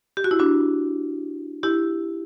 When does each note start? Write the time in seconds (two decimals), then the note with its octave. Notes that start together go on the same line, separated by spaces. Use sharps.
0.17 G4
0.24 F#4
0.31 E4
0.39 D4 F#4
1.63 E4 G4